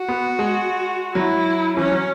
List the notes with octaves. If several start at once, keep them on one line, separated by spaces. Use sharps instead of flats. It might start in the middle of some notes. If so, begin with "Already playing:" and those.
Already playing: F#4
B3
G#3
F#3 E4
E3 C#4
F#3